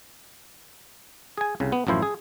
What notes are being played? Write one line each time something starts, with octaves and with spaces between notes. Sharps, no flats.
G#4 G#5
C2 C#3
B3
A1 F#2 F3 E4 C5
G#4